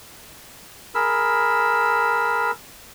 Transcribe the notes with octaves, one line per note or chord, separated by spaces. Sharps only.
G#4 A#4 B5 E6